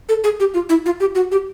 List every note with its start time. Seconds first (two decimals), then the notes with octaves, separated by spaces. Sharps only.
0.09 A4
0.24 G#4
0.40 G4
0.54 F4
0.69 E4
0.86 F4
1.00 G4
1.15 F#4
1.32 G4